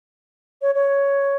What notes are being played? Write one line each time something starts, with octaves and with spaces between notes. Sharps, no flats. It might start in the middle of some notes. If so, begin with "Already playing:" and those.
C#5
C#5